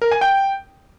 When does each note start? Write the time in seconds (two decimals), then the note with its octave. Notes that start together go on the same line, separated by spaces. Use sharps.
0.02 A#4
0.11 G#5
0.21 G5